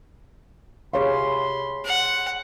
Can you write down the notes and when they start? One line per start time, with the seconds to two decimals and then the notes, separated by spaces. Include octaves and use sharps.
0.93 C3 G#4 C#5 F5 B5 C6
1.85 F#5